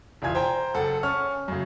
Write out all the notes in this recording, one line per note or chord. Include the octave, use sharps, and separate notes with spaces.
E1 E3 F4 G#5 G#6
C5 G5 A#5
F#1 A4 F#5
C#4 C#6 F6
F#2 C#3